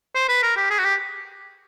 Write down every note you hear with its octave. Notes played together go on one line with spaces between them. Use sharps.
C5
B4
A#4
G4
G#4
F#4
G4